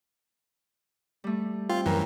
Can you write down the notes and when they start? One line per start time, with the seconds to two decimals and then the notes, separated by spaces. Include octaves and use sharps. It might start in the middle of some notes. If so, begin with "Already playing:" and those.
1.24 G3 A3
1.69 C4 F4
1.86 F#2 E3 A#4